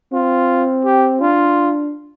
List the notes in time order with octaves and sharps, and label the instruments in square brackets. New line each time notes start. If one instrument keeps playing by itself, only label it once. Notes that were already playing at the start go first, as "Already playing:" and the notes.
[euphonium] C4 [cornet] F4
[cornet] G4
[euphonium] D4 [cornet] F4